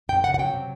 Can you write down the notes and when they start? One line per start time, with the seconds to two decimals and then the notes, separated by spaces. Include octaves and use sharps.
0.09 F#2 G5
0.23 C#3 F#5
0.34 F#5
0.39 F#3 G5
0.53 C3